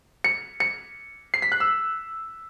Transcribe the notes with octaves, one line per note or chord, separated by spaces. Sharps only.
C#7
C#7
C7
B6
F#6
E6